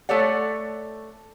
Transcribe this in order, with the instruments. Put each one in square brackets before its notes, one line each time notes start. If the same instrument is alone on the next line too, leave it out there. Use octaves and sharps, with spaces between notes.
[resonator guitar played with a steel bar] A3 A4 C#5 D5 F#5